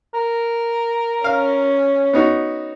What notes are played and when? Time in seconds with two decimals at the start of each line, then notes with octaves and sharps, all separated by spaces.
0.14 A#4
1.24 C#4 F5
2.13 B3 D#4 F#4